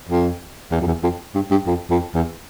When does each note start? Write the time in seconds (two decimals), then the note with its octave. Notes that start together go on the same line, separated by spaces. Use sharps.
0.09 F2
0.71 E2
0.81 F2
0.87 E2
1.03 F2
1.35 G2
1.51 G2
1.66 F2
1.90 F2
2.14 E2